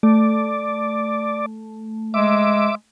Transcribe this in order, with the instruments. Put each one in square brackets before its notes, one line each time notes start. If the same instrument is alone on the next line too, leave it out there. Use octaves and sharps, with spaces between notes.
[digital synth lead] A3 [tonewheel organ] D5
[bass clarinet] G#3 [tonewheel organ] E5 D6